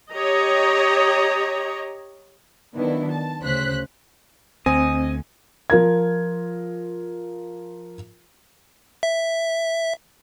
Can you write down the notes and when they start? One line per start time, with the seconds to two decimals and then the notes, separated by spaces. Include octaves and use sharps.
0.14 G4 C#5 D#5 A#5
2.74 D#3 F#3 B3 D4 E4
3.10 A5
3.42 D2 C#3 C5 F#6 B6
4.66 D2 C4 D#5 G#5
5.70 F3 F4 A#4 G#6
9.03 E5